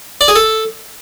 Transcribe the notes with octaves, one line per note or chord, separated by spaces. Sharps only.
D5
G#4
A4